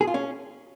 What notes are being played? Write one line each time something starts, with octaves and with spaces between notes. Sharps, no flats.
G#4
F4
C#4